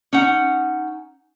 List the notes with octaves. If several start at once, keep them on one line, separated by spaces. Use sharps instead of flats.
C#4 D#4 F#5